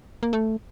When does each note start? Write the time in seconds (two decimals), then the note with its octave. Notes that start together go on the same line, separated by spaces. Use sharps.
0.23 A#3
0.33 A3